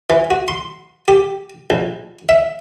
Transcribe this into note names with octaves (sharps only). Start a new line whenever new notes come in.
E3
F#4
C6
G4
A#1
E5